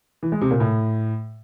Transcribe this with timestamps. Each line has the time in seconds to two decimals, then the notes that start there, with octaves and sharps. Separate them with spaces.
0.23 E3
0.32 G#3
0.41 C3
0.51 A#2
0.60 A2